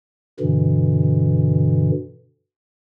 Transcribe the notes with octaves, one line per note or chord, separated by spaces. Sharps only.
G2 B2 D3 E3